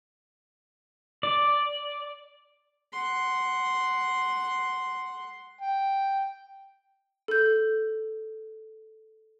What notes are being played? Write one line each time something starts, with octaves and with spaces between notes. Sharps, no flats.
D5
F#5 C6
G5
A4 G6